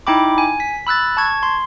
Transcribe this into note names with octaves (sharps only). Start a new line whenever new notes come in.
D#4 E4 G5 B5 D6
G#5
B6
B5 E6 F#6 A6
A5 C#6 G#6
C6